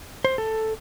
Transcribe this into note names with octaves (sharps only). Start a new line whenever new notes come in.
C5
A4